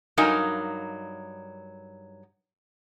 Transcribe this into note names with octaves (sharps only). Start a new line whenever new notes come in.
G2 F#3 D#4 A#4 F5 G#5